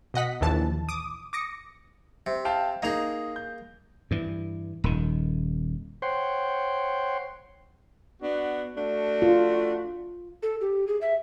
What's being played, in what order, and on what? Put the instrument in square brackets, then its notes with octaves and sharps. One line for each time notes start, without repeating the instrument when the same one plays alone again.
[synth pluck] B2 D#5 F#5 B6
A#1 D#2 E3 A5
D6 D#6
D6 D#6 A#6 C#7
[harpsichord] C3
[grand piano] F5 G5 A5
[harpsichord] A#3 G#4 [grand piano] D#4 F7
[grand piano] G6
[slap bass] G2 E3
D#1 D#3
[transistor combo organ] C5 C#5 F#5 G5 C6
[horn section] B3 D4 F#4
A3 D4 F#4
[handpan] F4
[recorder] A4
G4
G#4
E5